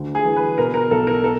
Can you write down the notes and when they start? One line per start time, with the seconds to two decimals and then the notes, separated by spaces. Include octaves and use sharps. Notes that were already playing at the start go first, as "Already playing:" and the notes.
Already playing: D2 D3
0.15 G#4
0.25 E3
0.36 B4
0.58 B2 A#4
0.74 A#4
0.91 B1 A4
1.07 A#4
1.24 A4